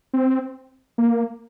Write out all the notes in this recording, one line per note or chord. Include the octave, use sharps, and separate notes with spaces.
C4
A#3